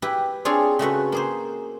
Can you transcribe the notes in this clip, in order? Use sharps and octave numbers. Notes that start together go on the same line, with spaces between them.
E4 G4 B4
C4 D4 F4 G#4 C#5
C#3 A3 F#4 B4
A#3 G#4 C5